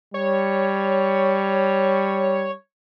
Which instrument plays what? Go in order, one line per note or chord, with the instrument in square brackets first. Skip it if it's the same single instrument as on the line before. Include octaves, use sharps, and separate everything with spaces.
[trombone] G3 [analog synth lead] C#5